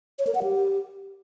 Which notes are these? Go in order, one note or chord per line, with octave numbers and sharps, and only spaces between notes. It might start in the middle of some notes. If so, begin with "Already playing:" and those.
C#5
A#4
F#5
G4